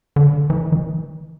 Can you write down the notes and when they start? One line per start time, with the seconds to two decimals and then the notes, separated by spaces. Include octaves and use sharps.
0.16 D3
0.50 E3
0.72 E3